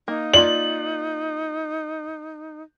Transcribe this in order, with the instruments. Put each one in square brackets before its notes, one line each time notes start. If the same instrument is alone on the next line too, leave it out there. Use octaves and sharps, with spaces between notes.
[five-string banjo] A#3 [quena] D#4
[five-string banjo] A#3 F4 D5 [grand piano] F#7